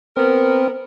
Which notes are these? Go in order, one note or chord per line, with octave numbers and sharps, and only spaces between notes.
B3 C4 A#4